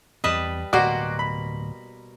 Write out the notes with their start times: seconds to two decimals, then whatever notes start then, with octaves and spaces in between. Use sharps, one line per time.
0.24 E2 G3 C4 B4 D#5 A5
0.73 D1 B2 A#3 F#4 C5 D5
1.19 B5